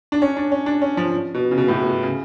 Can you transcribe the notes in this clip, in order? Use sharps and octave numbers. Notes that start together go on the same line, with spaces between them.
D4
C#4
D4
C#4
D4
C#4
F3
B2
C#3
B2
A2
B2
B2
C#3